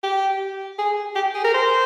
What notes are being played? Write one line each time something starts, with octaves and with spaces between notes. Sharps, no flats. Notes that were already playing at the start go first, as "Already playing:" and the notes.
G4
G#4
G4
G#4
A#4
C5